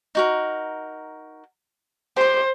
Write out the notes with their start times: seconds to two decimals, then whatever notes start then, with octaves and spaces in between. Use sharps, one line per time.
0.15 D#4 F#4 A#4
2.16 G4 C5 C6